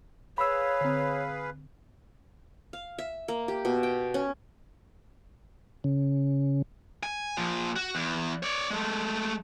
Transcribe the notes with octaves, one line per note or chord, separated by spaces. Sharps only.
G#4 B4 C#5 F5 B5 E6
D3 C4
F5
E5
A#3
G4
B2
G5
C#4
C#3
G#5
A#2 F3
F#4
E2
C#5 D5
G#3 A3